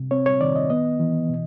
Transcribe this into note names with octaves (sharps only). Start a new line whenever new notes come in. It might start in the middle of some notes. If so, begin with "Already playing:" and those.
Already playing: C3
C4 C#5
C#5
D#3 D5
D#5
B3 D#5
E3
B2